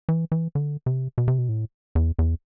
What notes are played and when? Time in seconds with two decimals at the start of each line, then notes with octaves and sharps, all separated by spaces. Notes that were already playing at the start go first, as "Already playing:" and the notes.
0.09 E3
0.32 E3
0.55 D3
0.86 C3
1.18 B2
1.28 C3
1.38 B2
1.49 A2
1.95 E2
2.19 E2